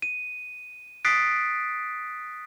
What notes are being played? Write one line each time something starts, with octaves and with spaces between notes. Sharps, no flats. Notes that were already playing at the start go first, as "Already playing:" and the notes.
D#7
D#6 F#6 A6 B6 C7 D7